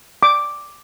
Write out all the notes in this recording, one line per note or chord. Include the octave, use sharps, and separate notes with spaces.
D6